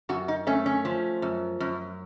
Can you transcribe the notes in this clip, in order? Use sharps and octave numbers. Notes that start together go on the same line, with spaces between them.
F#2 F#4
D#4
A3 C#4
C#4
F3
F#2
F#2